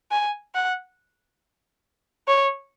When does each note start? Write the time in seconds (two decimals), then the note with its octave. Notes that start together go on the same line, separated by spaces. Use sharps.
0.11 G#5
0.55 F#5
2.28 C#5